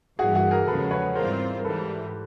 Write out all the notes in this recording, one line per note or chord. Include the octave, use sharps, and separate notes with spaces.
G2 E3 G3 A#3 F#4 G#4
F#4 G#4
G#4 A#4
E2 C#3 F3 G#3 A4 B4
B4 C#5
G#2 E3 G3 C4 F4 A#4 C5
A#4
G#2 E3 G3 A4 B4